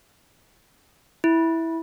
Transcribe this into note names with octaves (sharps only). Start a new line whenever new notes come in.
E4